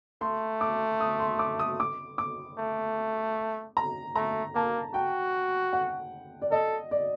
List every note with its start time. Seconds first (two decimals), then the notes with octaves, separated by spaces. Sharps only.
0.21 A3 C6
0.61 D6
1.00 D#6
1.20 C6
1.39 D6
1.59 D#6
1.80 D6
2.18 D6
2.58 A3
3.77 A#5
4.16 A3 A#5
4.55 A#3 A5
4.94 F#4 G5
5.73 F#5
6.42 D5
6.51 A4 D#5
6.91 D5